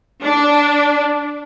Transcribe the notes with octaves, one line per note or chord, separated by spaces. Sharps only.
D4